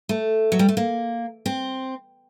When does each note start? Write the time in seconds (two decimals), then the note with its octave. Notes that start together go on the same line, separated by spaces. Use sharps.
0.09 A3
0.52 F#3
0.59 G3
0.68 A3
0.77 A#3
1.46 C4